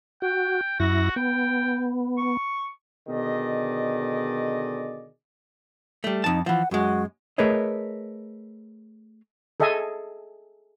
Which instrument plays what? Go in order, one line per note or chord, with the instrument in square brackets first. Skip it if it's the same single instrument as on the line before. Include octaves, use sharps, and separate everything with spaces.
[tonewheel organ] F#4 [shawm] G5
[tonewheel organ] F#2 E4 A#6 [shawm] F#4
[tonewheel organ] B3 [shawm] G5
[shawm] C#6
[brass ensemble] B2 D3 D#3 G#4 D5 D#5
[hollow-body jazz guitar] G3 A3
[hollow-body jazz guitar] F2 A5 [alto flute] D#4
[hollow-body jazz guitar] E3 F3 [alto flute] F#5
[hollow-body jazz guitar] F#2 G#3 [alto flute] F#4
[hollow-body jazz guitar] A3 G#4 A#4 B4 C#5 D#5
[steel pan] G#4 A4 D#5 E5 G#5